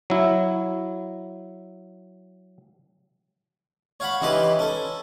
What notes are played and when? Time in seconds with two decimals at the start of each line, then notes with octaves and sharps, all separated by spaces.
0.10 F#3 E4
4.00 C#5 F5 F#5 B5
4.21 C#3 E3 D#4 G4 B4 C6
4.59 C#4 A4